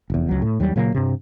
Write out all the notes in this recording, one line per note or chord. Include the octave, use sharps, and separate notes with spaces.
F1 E2
C#2 F#3
A2
D#2 F#3 G3
A#2 C#3 F#3 A#3
G2 C3